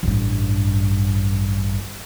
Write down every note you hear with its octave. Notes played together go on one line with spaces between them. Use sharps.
A1 G2